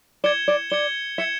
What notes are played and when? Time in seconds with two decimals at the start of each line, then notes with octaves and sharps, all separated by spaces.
0.24 D5 G#6 C#7 E7 G7
0.48 D5
0.70 D5 G#6 C#7 E7 G7
1.18 E5 G#6 C#7 E7 G7